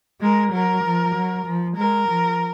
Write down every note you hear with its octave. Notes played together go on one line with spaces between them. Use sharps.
G#3 A#4
F#3 A#4
F3
F#3
F3
G#3 A#4
F3